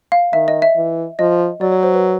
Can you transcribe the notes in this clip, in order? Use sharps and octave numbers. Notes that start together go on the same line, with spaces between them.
F5
D#3 E5
D#5
E5
E3
F3 D#5
F#3 D5
C#5
C5
B4